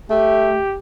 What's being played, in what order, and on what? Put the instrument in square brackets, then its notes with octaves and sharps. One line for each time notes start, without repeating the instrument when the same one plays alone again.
[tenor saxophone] A3 [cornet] G4